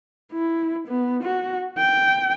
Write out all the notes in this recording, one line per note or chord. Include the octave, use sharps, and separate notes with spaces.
E4
B3
F#4
G5